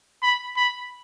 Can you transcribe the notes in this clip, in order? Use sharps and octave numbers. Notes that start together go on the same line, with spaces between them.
B5
B5